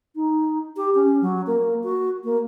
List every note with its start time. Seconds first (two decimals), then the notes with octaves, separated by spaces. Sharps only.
0.15 D#4
0.77 G4
0.95 C#4
1.21 F#3
1.47 A#3
1.83 F#4
2.24 A#3